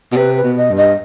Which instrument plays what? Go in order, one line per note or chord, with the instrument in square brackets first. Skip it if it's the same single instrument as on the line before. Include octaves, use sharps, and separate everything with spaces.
[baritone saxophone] B2
[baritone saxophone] C3 [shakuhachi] B4
[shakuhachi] B4
[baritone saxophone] B2
[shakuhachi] D#5
[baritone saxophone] G2
[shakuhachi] D#5